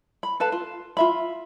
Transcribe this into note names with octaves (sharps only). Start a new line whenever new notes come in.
B5
A4 B4 F5 A5
F4
F4 E5 B5